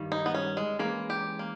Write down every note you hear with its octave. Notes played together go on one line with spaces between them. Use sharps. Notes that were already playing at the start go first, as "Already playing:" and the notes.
Already playing: G2 D#3 G3
D#4
B3
C#4
G#3
E3 G#3 A#3 C#4 G#4 B4
G4
A#3